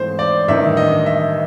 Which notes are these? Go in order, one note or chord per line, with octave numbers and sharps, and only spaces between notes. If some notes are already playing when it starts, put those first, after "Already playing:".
Already playing: G#2 E3 A3 C4 C5
D5
A1 G2 D#3 E5
D#5
E5